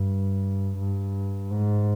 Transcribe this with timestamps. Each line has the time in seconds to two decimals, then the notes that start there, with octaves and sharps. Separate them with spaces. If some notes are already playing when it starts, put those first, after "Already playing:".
Already playing: G2
0.78 G2
1.51 G#2